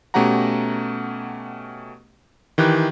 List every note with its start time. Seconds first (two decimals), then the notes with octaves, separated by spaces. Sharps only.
0.14 B2 A3 C#4 G4 F#5 A#5
2.58 D#3 E3 G4 F#6